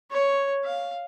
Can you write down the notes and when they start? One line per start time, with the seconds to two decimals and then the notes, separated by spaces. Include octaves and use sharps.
0.11 C#5
0.65 F5